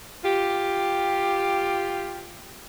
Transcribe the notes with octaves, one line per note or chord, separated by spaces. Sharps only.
F4 G4